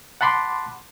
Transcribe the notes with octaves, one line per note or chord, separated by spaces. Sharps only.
F#5 A5 B5 C6 D6